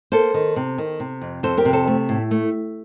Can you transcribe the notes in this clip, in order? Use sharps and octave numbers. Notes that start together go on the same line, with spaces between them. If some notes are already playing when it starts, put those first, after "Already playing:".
A#3 A4 C5
D#3
C3
D#3
C3
F2
F2 A4 C5
G4 A#4
C3
A4 C5
A3
A2
A3